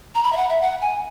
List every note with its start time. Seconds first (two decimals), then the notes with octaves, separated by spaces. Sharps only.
0.15 A#5
0.24 B5
0.33 E5
0.37 F#5
0.49 E5
0.62 F#5
0.81 G#5